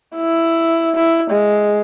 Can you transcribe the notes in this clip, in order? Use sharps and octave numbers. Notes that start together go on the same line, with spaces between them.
E4
E4
G#3